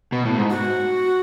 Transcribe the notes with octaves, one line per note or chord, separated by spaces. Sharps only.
B2
A2
G#2
F#4